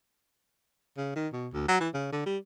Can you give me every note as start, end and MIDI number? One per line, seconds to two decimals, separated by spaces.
0.97 1.12 49
1.16 1.27 51
1.33 1.48 47
1.53 1.64 38
1.68 1.77 54
1.80 1.89 52
1.94 2.10 49
2.12 2.22 50
2.26 2.37 55